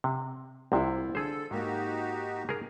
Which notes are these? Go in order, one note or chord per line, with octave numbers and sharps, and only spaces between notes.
C3
C2 C3 E4 F4 C5
D3 G#4 A4 C5
G#2 A#3 D#4 F#4 G4
G#4 A#4